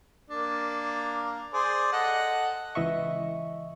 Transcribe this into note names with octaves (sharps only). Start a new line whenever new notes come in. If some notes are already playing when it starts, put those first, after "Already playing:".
A#3 D4
G#4 C5 D5
A4 D#5 F#5
C#2 E3 D#5 E5 C#6